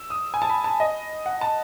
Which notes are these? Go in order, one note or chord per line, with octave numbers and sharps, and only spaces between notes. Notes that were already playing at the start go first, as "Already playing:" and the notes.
Already playing: E6
D#6
G#5
A5
B5
A5
D#5
F#5
A5